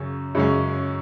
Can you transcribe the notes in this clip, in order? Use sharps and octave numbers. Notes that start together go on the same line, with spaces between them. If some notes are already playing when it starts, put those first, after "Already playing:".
Already playing: F#2 C#3 C#4
F#2 C#3 G#3 C#4